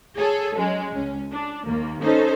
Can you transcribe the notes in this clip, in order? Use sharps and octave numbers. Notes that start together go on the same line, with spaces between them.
G#4 A4 C#5
F#3 G#3 C#4
C#2 C#4
D4
D#2 A#3
C#4 D#4 A4 C5